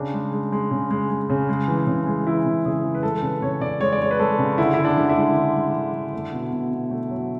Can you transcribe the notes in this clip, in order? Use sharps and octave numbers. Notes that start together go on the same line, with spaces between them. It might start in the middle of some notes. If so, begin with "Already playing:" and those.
Already playing: C#3 D4
G#3
G#3
G#3
C#3
G#3
G#3
C#3
G#3
E3
C#3
G#3
E3 E4
C#3
C#3 G#4
E3
B4
G#3 A4
C#3 B4
C#3 C#5
C#3 D5
G#3 C#5
D5
G#3 C#5
B4
G#3 A4
C#3
D3 E4
D3 E4
D4
D3
D4
E4
G#3
D3
G#3
D3
D3
A3
B2
B2
B2
A3
F#3